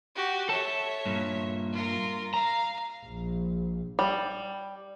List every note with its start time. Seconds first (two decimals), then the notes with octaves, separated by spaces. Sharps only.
0.15 F#4 G4
0.49 A4 C#5 E5 A5
1.06 G2 A#2
1.72 F4 A#4
2.34 F5 A#5
3.05 A#1
3.99 G3